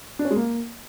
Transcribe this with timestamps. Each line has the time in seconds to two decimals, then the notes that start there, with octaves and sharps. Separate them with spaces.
0.19 D4
0.25 C#4
0.31 G#3
0.36 A#3